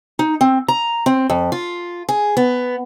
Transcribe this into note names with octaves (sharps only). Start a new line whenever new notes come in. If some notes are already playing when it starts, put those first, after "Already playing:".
D#4
C4
A#5
C4
F2
F4
G#4
B3